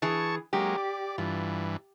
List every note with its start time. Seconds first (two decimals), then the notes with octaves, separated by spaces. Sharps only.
0.02 E3 G#4 A5 C#6
0.53 F#3 G#3 A#3 G4
0.77 D5
1.18 G2 E3 F4